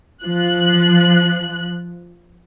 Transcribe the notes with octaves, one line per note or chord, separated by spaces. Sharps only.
F3 F#6